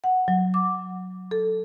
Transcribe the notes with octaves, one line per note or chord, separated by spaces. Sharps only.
F#5
F#3
D6
A4